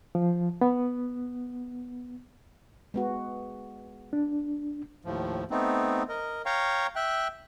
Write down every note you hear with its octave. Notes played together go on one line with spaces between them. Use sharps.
F3
B3
G#3 B3 F#4
D4
D#2 A2 F3
A3 B3 C4 D#4
A#4 D#5
C#5 F5 G5 A#5 C#6
E5 G5 F#6